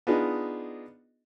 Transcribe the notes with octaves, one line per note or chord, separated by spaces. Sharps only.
B3 D4 D#4 F4 G#4 D#5